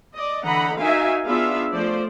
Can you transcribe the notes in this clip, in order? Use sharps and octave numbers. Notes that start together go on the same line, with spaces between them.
D5 D#5
D3 E3 D#5 F#5 A#5 B5
D#4 F#4 A#4 E5 F5 G#5
B3 D4 F4 G#4 E5 F5
F3 A3 C5 D5